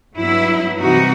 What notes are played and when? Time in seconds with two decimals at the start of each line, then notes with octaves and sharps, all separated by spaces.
0.17 G2 F#3 B3 E4
0.79 C3 E3 G3 D#4 F#4